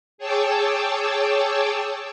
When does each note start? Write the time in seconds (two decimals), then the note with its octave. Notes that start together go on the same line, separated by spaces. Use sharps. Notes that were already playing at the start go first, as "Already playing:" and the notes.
0.18 G#4 C#5 G5 A5 D6 E6